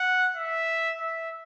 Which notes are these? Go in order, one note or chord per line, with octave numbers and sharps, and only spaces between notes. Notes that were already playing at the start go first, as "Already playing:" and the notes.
Already playing: F#5
E5
E5